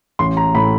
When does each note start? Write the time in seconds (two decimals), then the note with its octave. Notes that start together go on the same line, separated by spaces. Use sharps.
0.19 A1 C6
0.37 A#5
0.55 A2 B5